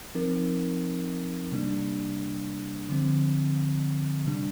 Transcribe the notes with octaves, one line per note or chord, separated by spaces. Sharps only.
F3 C4 D#4 A#4
C3 G3 A#3 D4
D3 F3 C4
C3 G3 D4